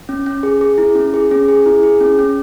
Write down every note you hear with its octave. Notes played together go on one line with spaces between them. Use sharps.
C#4
C#4
G#4
G#4
E4
C#4
G#4
C#4
G#4
E4
G#4
C#4
C#4